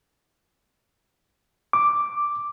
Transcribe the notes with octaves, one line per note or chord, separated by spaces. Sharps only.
D6